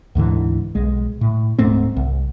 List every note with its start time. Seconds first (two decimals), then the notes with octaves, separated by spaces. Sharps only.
0.15 D2 G#2 D3 E3
0.75 B1 G#3
1.21 A2
1.58 D1 G#2 A3 C4
1.96 C2